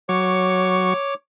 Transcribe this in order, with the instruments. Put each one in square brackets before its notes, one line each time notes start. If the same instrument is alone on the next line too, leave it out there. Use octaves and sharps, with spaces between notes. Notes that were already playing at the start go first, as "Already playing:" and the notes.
[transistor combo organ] F#3 C#6 [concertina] C#5 D6